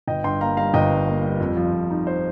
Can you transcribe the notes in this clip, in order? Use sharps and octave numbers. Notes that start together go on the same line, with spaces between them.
G1 D#5 G5
G2 G5 C6
A#3 F5 A#5
G3 F5 A#5
G1 D#5 G5
G2
A#3
G3
F2
F3
F2
D#4
C5